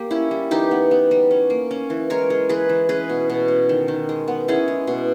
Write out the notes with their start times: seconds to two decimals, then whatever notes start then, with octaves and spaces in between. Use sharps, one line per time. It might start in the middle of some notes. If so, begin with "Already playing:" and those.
Already playing: A#3 G4
0.11 C#4 E4
0.31 G3
0.51 E3 D#4 G4
0.71 B3
0.91 B3
1.11 G3
1.31 C#4
1.50 A#3
1.71 C#4
1.90 E3
2.10 G#3 A#4 C#5
2.30 G#3
2.49 E3 G#4 B4
2.69 E3
2.89 C#4 G#4 B4
3.09 B2
3.30 B2
3.48 C#4
3.69 D#3
3.88 D#3
4.09 G#3
4.28 B3
4.48 C#4 E4 G#4
4.68 G#3
4.87 B2